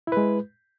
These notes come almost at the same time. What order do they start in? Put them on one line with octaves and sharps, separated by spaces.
E4 B4 G#3